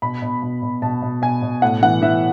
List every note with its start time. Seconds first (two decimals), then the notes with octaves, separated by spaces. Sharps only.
0.02 B2 B5
0.22 B2
0.42 B2
0.62 B2
0.82 B2 A5
1.02 B2
1.22 B2 G#5
1.42 B2
1.62 A2 F#5
1.82 E3 F#5
2.02 E3 E5